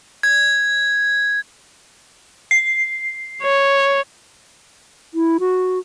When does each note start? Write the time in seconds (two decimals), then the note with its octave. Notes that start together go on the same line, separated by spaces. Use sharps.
0.23 G#6
2.51 C7
3.43 C#5
5.14 E4
5.40 F#4